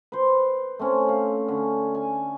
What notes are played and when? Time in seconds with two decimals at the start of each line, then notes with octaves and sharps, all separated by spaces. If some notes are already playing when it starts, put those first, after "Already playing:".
0.12 B4 C5
0.79 A3 C4 C#4
1.09 F5
1.48 D3 C#4
1.95 G#5